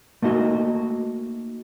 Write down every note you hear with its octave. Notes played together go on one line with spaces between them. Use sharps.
A3 A#3 D#4 F#4